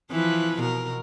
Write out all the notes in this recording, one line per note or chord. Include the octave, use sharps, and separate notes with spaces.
E3 F3 B4
B2 A#4